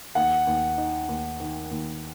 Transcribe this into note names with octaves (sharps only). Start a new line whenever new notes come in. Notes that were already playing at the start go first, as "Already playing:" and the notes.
D#2 F#5
D#2
D#4
D#2
D#3
D#2